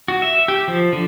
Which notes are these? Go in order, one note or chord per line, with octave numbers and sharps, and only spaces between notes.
F#4
E5
G4
F3
D3